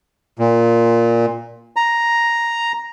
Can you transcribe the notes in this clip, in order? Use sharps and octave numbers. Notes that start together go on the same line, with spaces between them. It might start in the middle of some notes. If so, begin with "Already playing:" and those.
A#2
A#5